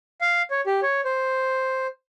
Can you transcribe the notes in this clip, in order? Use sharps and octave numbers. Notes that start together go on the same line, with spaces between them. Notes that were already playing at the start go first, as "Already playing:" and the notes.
F5
C#5
G4
C#5
C5